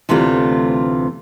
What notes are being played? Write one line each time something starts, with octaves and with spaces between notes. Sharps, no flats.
D2 C3 E3 A3 F4